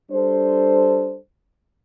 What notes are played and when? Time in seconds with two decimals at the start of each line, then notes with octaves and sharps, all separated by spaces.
0.11 G3 D4 A4 C5